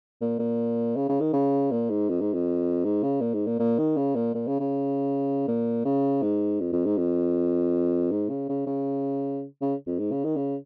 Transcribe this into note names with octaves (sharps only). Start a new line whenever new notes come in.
A#2
A#2
C#3
C#3
D#3
C#3
A#2
G#2
F2
G#2
F2
G#2
C#3
A#2
G#2
A#2
A#2
D#3
C#3
A#2
A#2
C#3
C#3
A#2
C#3
G#2
F2
F2
G#2
F2
G#2
C#3
C#3
C#3
C#3
F2
G#2
C#3
D#3
C#3